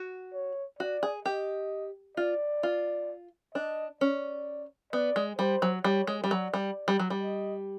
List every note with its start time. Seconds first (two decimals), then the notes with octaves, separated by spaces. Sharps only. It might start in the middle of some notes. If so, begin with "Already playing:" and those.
Already playing: F#4
0.34 C#5
0.79 F#4 D5
1.03 G#4
1.25 G4 D#5
2.17 F4 D5
2.63 F4
3.54 D4 D#5
4.01 C#4 D5
4.93 B3 D5
5.16 G#3
5.38 G3 C5
5.62 F#3
5.84 G3 C#5
6.07 G#3
6.24 G3
6.30 F#3 D5
6.54 G3
6.88 G3
6.99 F#3
7.10 G3
7.22 D#5